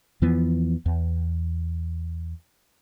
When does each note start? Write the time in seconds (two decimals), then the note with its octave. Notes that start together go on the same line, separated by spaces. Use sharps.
0.22 E2 E3 F3 B3
0.86 E2